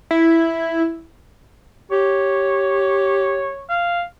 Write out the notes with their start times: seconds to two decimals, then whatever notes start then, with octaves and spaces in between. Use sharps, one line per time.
0.11 E4
1.92 G4 C#5
3.69 F5